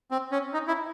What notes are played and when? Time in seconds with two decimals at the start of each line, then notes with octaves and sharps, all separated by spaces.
0.11 C4
0.32 C#4
0.53 D#4
0.68 E4